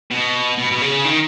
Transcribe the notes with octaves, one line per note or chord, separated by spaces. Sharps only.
B2
B2
B2
C#3
D#3